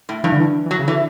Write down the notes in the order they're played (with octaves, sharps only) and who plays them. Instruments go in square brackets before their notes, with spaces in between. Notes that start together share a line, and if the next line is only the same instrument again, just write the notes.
[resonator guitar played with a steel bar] A2
[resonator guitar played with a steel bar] G2 [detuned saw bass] E3
[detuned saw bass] D3
E3
E3
[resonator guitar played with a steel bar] F#3
[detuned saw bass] C#3
[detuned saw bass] D3 [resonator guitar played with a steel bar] E3